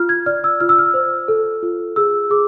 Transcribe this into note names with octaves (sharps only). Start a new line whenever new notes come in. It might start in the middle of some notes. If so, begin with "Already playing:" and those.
Already playing: F4 F6
G#6
D5 F6
E6
F4 F6
E6
F6
C5
A4
F4
G#4 E6
G#4 D6